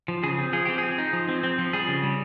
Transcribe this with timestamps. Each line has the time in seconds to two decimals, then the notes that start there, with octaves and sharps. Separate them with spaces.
0.08 F3
0.23 C#3 G#4
0.38 C4
0.53 F3 G#4
0.65 C4 G4
0.78 G#4
0.83 C4
0.98 D#4
1.13 F3
1.29 C4
1.43 C4
1.59 F3
1.73 G3 G#4
1.88 C#3
2.03 G3